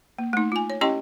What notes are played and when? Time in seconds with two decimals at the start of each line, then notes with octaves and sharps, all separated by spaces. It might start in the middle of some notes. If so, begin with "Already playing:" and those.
0.19 A#3
0.33 A3 D#4
0.52 F4 G#5
0.70 C#5
0.81 C#4 E4 G4 D#5 G5 C6